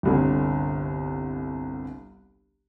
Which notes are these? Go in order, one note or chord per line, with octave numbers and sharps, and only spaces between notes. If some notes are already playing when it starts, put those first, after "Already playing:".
G1 C2 D3